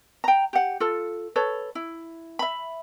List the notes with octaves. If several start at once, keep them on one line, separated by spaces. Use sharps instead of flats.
G5 A#5
G4 F#5
F4 A4
A4 B4 C#5
E4
E5 B5